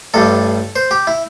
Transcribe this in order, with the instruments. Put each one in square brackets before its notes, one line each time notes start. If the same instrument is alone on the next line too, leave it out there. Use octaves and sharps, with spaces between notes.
[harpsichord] A1 G2 G3 A4
C5
G4
E4